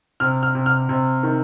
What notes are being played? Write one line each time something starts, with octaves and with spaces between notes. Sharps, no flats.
C3 F6
F6
C3
F6
C3
D#3